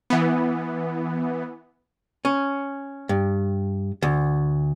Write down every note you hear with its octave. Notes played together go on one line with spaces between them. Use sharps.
E3 B3
C#4
G2
D2